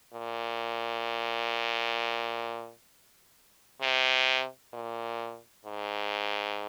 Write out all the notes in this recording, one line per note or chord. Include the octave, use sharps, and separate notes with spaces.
A#2
C3
A#2
G#2